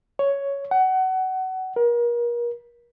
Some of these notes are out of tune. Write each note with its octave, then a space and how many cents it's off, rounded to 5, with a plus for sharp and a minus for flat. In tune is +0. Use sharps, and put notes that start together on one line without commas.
C#5 +5
F#5 +25
A#4 +35